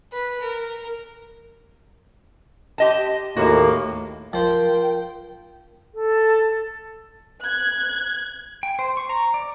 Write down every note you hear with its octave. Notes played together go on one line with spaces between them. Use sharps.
B4
A#4
G4 D#5 A5
D#2 A2 A#3 F#4 D#5
F3 A#4 C5 G5
A4
F#6 G#6
G5
C5
C#6
A#5
D5